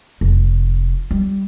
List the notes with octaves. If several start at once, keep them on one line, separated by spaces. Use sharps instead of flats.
F1
G3